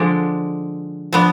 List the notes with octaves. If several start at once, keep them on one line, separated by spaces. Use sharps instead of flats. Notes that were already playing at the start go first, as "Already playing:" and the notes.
Already playing: D3 F3 G#3 D5
F3 B3 D4